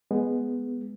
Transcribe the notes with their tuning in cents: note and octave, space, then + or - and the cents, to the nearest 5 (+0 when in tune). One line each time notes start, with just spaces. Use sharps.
G#3 +0 B3 +0